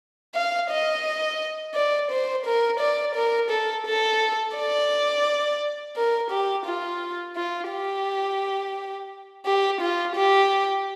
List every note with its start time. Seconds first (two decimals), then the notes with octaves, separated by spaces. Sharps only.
0.35 F5
0.71 D#5
1.75 D5
2.11 C5
2.46 A#4
2.80 D5
3.15 A#4
3.51 A4
3.86 A4
4.56 D5
5.96 A#4
6.31 G4
6.65 F4
7.36 F4
7.71 G4
9.46 G4
9.81 F4
10.16 G4